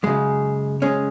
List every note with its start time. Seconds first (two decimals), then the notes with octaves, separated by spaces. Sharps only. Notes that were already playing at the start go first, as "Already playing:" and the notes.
0.03 F#2 C#3 G#3
0.82 G#3 C#4